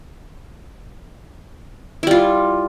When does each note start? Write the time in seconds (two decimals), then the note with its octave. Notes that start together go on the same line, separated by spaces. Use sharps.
2.03 E4
2.07 G3
2.11 F4